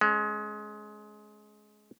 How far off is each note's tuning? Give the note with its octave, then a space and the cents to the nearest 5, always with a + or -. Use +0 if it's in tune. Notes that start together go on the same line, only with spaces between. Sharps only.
G#3 +25 C#4 +0